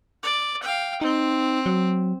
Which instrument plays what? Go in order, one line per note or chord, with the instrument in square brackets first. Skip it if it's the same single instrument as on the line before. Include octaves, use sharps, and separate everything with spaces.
[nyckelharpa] D5
F5 G5
[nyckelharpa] C4 [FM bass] D#4
[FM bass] F#3